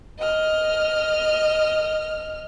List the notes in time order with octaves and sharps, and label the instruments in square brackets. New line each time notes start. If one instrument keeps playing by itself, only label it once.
[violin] D#5 F6